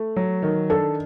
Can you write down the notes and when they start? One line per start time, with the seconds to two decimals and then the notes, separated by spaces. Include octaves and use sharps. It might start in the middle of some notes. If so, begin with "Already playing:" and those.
Already playing: A3
0.16 F#3
0.42 D#3
0.70 D4 A4